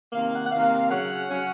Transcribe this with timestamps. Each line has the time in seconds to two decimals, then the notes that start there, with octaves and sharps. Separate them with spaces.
0.13 C3 D#3 A#3 F5
0.33 F#5
0.44 F#5
0.51 C3 D#3 A#3 F5
0.90 C#3 F#3 C#4 F#5
1.28 C#3 F#3 C#4